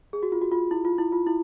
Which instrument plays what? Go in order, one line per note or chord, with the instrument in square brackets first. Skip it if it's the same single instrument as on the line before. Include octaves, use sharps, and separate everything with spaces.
[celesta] G#4
F#4
F4
F#4
F4
E4
F4
E4
F4
E4